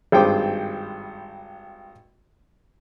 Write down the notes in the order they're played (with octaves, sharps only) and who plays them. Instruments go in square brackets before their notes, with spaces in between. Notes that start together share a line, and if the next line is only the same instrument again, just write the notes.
[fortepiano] G#1 G2 G#3 C5 G5 D6